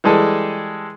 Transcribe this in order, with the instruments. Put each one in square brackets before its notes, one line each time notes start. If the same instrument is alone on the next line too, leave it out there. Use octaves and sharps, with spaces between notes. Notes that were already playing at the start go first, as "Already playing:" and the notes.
[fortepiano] E3 G3 G#3 G#4 A4